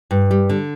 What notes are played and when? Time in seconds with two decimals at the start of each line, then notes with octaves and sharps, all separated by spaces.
0.11 G2
0.31 G3
0.50 D3